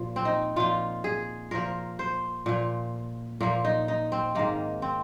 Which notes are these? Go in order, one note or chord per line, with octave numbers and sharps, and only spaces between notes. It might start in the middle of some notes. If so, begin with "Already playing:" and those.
Already playing: A#2 F3
C4
D#4
A#2 F3 F4
G#4
A#2 F3 A#4
C5
A#2 F3
A#2 F3 A#3
D#4
D#4
C4
G#2 D#3 A#3
C4